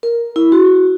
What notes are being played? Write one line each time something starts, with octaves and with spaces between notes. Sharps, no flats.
A#4
E4
F#4